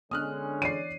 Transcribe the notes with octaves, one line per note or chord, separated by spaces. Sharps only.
D3 G#3 B3 C#4 D4 D#6 F6 F#6
E3 C#5 D5 C7 D#7